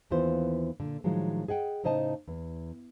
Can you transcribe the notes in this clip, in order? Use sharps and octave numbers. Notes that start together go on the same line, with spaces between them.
D#2 E3 B3 F4 C5
A#2 D3
A2 D#3 F3 F#3 G#3
G#4 D#5 F#5 G5
A2 C#3 D#4 C5 D#5 A5
E2